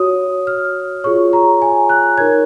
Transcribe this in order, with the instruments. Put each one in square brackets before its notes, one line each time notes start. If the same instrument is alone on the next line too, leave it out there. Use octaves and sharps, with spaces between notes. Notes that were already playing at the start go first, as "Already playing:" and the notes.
Already playing: [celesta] F#4 C#5 D#6
F6
F4 G#4 C#5 C#6
A#5
G#5
F#6
D#4 A#4 C#5 G#6